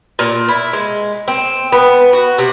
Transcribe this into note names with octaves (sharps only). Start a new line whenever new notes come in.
A#2
E4
G#3
C4
B3
F#4
C3